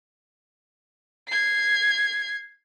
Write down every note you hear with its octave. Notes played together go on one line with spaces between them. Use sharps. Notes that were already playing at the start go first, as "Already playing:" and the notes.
G#6 C7